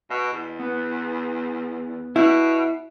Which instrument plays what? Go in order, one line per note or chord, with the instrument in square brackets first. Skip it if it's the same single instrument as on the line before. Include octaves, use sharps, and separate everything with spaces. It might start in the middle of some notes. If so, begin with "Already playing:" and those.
[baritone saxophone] B2 [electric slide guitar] D#5
[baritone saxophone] E2
[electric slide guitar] B3 B4
[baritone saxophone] B2 [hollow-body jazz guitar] E4